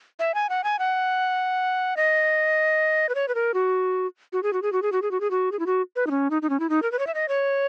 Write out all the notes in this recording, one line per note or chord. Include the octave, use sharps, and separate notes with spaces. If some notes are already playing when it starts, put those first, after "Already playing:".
E5
G#5
F#5
G#5
F#5
D#5
B4
C#5
B4
A#4
F#4
F#4
G#4
F#4
G#4
F#4
G#4
F#4
G#4
F#4
G#4
F#4
G#4
E4
F#4
B4
D#4
C#4
D#4
D#4
C#4
E4
D#4
A#4
B4
C#5
E5
D#5
C#5